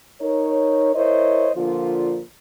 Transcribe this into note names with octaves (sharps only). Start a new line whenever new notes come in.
D#4 A#4 C#5
E4 A#4 C5 C#5 D#5
A#2 D3 F3 F4